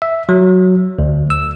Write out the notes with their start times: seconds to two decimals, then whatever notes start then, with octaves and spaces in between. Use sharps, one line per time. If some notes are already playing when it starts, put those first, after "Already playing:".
0.02 E5
0.29 F#3
0.99 D2
1.30 E6